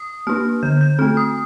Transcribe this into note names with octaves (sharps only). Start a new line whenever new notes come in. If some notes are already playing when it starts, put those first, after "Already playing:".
Already playing: D#6
A#3 D4 F6
D3 G6
G6
A3 C4 F6
D#6